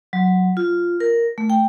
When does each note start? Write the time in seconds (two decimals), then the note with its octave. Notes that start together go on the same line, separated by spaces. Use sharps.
0.13 F#3
0.57 F4
1.00 A#4
1.38 A3
1.50 G5